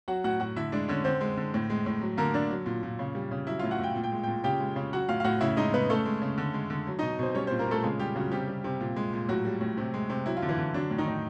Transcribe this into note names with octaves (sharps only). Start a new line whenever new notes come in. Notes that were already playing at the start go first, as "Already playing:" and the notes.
F#3 F#4 F#5
A2 F#4 F#5
A2 F#4 F#5
D3 E4 E5
G#3 D4 D5
D3 C#4 C#5
D3 C4 C5
G#3
D3
A2
G#3
A2
F#3
D3 A#3 A#4
D3 D4 D5
F#3
A#2
A#2
C#3
G3
C#3
F#3 E4 E5
A2 F4 F5
F#4 F#5
A2 G5
A#2
G5
G#3
A#2 G5
C#3 G4 G5
G#3
C#3
F#3 F#4 F#5
A2 F4 F5
F5
A2 F#4 F#5
C#3 E4 E5
G#3 D#4 D#5
C#3 B3 B4
C#3 A3 A4
G#3
C#3
D3
G#3
D3
F#3
B2 D#4 D#5
B2 C4 C5
G3 C#4 C#5
A#2 C4 C5
A#3 A#4
A#2 A3 A4
C#3 G#3 G#4
G3 G4
C#3 F#3 F#4
C3 G3 G4
G3
C3
A#2
G#3
A#2
A2 F#3 F#4
G3
A2
C3
G#3
C3
F#3 E4
F4
D3
E3 E4
D3
D3 F#3 D4
A2
D#3 D#4
A2